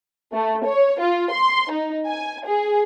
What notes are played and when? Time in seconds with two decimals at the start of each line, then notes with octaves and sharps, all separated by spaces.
0.34 A3
0.66 C#5
1.00 F4
1.32 C6
1.71 D#4
2.08 G#5
2.47 G#4